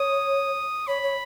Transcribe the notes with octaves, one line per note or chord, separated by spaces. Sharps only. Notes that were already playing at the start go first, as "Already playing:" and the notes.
Already playing: C#5 D#6
C#5 B5
C#5